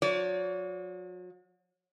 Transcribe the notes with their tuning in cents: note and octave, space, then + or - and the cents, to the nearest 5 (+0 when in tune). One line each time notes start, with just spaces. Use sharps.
F#3 -40 C#5 +45